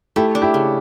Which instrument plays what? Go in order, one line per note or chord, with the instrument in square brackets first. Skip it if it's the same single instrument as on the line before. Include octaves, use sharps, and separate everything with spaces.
[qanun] A3 [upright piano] E4 G4
[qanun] D4
[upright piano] E4 G4
[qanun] C#3